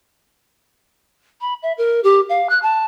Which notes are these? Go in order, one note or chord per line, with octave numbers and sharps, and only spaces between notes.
B5
E5
A#4
G4
F5
F#6
A5